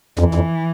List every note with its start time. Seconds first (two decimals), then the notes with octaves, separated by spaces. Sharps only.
0.19 F2 E3
0.35 F2